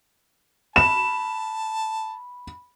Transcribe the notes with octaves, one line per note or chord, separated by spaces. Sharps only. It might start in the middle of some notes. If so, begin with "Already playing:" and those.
A5 B5 E7